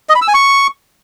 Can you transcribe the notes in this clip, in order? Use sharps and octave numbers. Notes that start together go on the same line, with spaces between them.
D#5
B5
E6
G#5
C#6